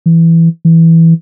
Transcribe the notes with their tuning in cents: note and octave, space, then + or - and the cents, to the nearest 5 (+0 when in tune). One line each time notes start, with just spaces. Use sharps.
E3 +5
E3 -5